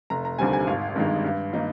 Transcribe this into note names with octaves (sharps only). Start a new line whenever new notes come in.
F1 A#5
A#5
D#2 D3 G3 C4 G#5
G#5
G#1 F5
G2 D#3 G#3
G2
D#3 A#3 D#4